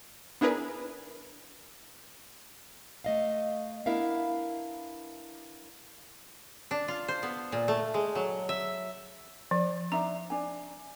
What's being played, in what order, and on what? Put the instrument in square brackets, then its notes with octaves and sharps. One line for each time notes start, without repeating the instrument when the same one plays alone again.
[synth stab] B3 D4 E4 G#4 A#4 B4
[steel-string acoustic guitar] A3 D#5 F5
B3 D4 E4 A#4 E5 F5
[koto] D4
F4
C5
B3
A#2
A3
G#3
F#3
E5
[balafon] F3 [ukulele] D5
[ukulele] D4 D#4 E5 [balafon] A#5
[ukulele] D4 G#5